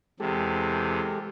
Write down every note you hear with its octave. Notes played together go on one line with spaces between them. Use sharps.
E2 C3 G#3 G4 A4